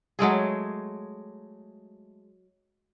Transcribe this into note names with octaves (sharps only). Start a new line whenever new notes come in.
F#3 G#3 A3 G#4